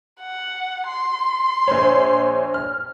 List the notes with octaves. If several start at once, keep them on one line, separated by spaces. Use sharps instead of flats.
F#5
C6
A#1 C5 C#5
F6